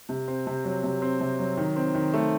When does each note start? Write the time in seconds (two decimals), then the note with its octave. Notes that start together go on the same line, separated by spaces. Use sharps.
0.09 C3
0.28 C4
0.47 C3
0.65 F#3
0.84 C3
1.02 C4
1.21 C3
1.39 F#3
1.57 D#3
1.76 C4
1.95 D#3
2.14 A3